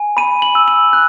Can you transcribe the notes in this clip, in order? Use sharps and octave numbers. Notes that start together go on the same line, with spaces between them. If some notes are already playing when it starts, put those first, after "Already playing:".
Already playing: G#5
B5 D#7
F#7
E6
F#7
F#6